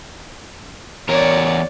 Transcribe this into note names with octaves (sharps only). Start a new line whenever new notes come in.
E2 A#4 C#5 D5